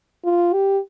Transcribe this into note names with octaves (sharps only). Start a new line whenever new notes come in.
F4
G4